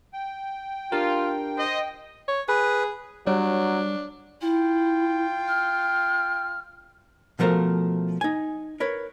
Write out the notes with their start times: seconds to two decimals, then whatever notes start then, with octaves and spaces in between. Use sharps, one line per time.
0.13 G5
0.92 D4 F4 G4 A#4
1.57 C5 D#5
2.28 C#5
2.48 G#4 B4
3.27 F#3 G3 D4 C#5
4.41 E4 F4 G5
5.48 F6
7.39 B2 F3 A3 A#4 C5 F5
8.21 D#4 G#5
8.80 A#4 B4 C#5